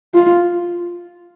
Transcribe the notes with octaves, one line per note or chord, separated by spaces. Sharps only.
F4